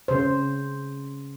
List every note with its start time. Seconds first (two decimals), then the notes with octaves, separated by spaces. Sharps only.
0.08 C#3 C5